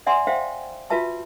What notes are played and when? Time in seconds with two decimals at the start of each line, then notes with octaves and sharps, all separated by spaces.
0.06 D5 E5 F#5 G#5 C6
0.27 C5 E5 F5 G5
0.90 F4 F#4 B4 E5 A5 C#6